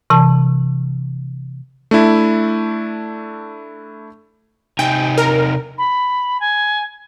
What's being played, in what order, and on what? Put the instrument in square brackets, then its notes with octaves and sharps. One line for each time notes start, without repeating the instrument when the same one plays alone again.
[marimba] C3 E3 A5
[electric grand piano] A3 D4 E4
[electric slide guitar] C3 D#4 G#5 [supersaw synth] G5
[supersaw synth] A#4
[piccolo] B5
G#5